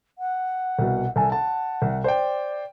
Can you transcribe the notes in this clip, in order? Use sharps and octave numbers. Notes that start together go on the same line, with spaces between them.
F#5
C2 B2
C2 A4 G#5 A5
F#5 A5
C2
C5 D5 G5